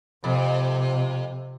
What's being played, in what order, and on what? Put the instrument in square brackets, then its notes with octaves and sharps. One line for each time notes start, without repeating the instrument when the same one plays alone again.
[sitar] F2 [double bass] C3